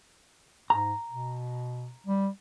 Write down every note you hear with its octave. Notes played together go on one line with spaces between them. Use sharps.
G#2 A#5
B2
G3